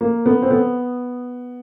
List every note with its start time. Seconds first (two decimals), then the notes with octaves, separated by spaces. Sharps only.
0.01 A#3
0.26 B3
0.42 C4
0.51 B3